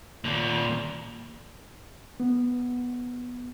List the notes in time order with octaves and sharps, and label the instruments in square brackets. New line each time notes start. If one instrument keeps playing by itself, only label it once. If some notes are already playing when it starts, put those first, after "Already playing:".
[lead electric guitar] D#2 A#2
[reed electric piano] B3